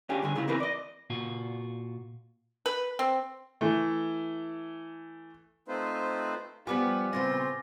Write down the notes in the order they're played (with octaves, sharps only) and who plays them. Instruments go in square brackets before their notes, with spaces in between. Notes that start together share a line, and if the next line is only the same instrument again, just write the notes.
[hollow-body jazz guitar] C#4 D4 F4 G4 G#4
G2 D3 G#4
C#3 G#3 E4 F4
E3 C4 E4 A#4 B4
D5 D#5
[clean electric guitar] A#2 F4 F#4
[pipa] B4
C4
[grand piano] E3 A3
[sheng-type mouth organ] A3 C4 D#4 F4 B4 C5
[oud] F3 G3 F4 [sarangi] B3 [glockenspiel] G#5 D6
[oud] A#2 C#3 B3 [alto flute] C4 [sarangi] F4 [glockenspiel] A6 A#6